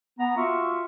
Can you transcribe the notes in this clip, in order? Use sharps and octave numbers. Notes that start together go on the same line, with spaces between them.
B3 A#5
F4 F#4 E5 C#6